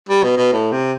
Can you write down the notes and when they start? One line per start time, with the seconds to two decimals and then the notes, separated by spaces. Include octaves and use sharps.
0.09 G3
0.24 B2
0.38 B2
0.53 A2
0.72 C3